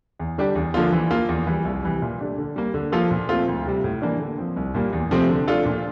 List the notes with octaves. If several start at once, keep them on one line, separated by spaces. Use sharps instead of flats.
E2
D3 G3 D4 G4
E2
D3 F3 A#3 F4
E3
A#3 F4
E2
E3 G3
C2
C3 E3 G3
A#2
A3 D4 G4
D3
G3 A#3
D3
F3 A#3 F4 A4
A#2
A3 C4 F4
D2
C3 G3
A2
E3 A#3 D4
D3
F3 C4
C2
A#2 G3 A#3
E2
C3 F3 A3 C4
D3
A3 D4 F4 A4
A#2